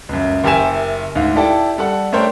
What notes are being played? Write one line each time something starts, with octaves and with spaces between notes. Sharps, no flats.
C#2 F#2
F#1 G4 A#4 E5 G#5 E7
D2 G#2 F5
E4 G4 A4 D5 G5 A5
G3 A4 F#5
A3 D4 A#4 C5 C#5 G5